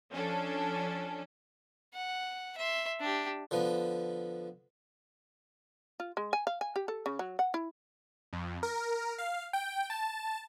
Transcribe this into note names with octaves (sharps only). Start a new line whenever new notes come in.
F3 C#4 D4 A4
F#5
E5 C6
D4 G4
D3 F3 B3
F4
G#3
G#5
F5
G#5
G4
A4
C#3
F#3
F#5
E4
F2
A#4
F5
G5
A5